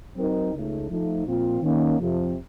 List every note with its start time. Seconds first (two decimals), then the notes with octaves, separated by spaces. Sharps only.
0.17 F#3 C4 D#4 A#4
0.54 C#2 C#3 A3 D#4
0.90 F3 A3 D#4
1.26 A#2 F3 C4 F4
1.62 D#3 A#3 C#4
2.00 F2 C3 F3